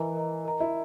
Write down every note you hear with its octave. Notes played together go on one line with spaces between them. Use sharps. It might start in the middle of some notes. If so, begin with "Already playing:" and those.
Already playing: E3 A#4 D#5 A#5
A#4 D#5 A#5
A#4 D#5 A#5
E4